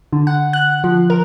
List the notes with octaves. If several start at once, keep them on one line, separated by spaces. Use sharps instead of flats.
D3
F#5
F#6
F3
A#4